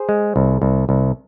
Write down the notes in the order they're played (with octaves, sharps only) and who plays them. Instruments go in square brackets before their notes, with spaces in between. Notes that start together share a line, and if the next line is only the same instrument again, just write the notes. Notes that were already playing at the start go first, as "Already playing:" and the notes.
Already playing: [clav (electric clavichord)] G#4 C5
G#3
C2
C2
C2